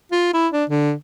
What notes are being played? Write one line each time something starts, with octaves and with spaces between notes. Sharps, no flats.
F4
E4
D4
D3